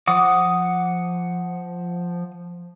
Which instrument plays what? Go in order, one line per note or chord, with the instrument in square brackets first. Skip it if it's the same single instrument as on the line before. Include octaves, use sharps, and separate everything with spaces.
[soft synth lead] F3 [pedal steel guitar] F#5 D6 D#6